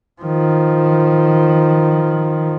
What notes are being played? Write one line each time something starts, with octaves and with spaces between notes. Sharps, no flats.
D#3 F3